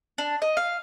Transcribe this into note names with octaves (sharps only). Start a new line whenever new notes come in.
D4
D#5
F5